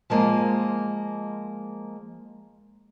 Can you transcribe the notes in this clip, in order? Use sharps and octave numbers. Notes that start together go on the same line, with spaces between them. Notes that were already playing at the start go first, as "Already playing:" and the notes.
F3 G#3 A#3